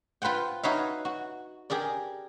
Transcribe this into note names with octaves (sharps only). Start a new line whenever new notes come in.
F4 B4 C5 F#5 G5
D#4 F#4 B4 C#5 E5 F5
F#4
G4 G#4 A#4 D5